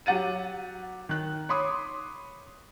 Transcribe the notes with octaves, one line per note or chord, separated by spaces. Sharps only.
F#3 G4 F#5 A6 D#7
D#3 F#6
C#5 B5 C6 D6 D#6